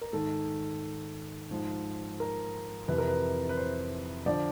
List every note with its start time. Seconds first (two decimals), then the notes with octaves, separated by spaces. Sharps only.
0.01 A#4
0.13 G#2 D#3 A4
1.51 G#2 F3
2.20 A#4
2.88 F2 C3 E3 B4
2.98 A#4
3.08 B4
3.49 B4
3.57 C5
4.26 D3 F3 D5